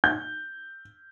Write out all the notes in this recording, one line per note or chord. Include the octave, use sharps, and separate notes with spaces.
G6